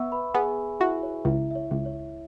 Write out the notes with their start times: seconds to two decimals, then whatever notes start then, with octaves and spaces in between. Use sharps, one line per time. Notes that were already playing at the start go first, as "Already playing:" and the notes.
Already playing: B3 E5 C#6 E6
0.12 B4 B5
0.34 B3 G#4 G#5
0.80 E4 F#4 E5
1.03 C#5
1.25 C#2 E4 E5
1.51 E5
1.55 C#5
1.71 C#2
1.86 C#5